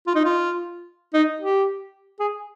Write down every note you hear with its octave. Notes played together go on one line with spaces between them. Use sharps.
F4
D#4
F4
D#4
G4
G#4